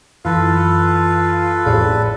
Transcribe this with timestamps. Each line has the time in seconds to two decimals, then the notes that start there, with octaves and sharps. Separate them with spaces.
0.25 F#2 E3 F4 A4 B4
1.66 A1 F2 A2 G3 G#4